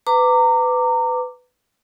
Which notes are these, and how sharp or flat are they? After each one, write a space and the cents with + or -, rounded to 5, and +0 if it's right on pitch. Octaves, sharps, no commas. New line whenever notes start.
B4 +20 A#5 -25 D6 +0